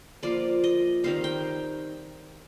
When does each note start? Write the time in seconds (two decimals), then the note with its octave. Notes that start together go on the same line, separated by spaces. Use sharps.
0.23 F3 A#3 F4 D5
0.64 D#5
1.04 D#3 G3 C4 D#4 F5
1.24 G5